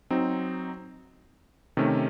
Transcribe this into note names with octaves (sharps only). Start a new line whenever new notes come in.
F#3 C4 D#4
C3 D#3 A3 C#4